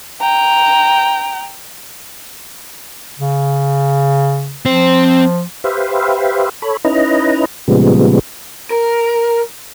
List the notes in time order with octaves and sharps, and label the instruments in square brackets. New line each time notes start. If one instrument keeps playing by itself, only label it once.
[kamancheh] G5 A#5
[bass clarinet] C#3
[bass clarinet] F3 [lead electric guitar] C4 C5
[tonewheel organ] G4 B4 C5 E5 F5
A4 C#5 B5
C#4 D#4 E4 B4 D#5 A#5
A#2 C#3 F3 G3 G#3 B3
[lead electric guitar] A#4